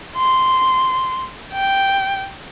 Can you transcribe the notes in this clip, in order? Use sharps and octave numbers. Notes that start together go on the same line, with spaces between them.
C6
G5